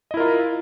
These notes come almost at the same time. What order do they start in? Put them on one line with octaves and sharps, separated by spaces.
D#5 E4 A#4 F4